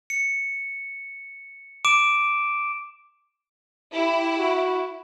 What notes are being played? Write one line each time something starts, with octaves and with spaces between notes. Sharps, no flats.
C#7
D6 D7 E7
E4 G4
F#4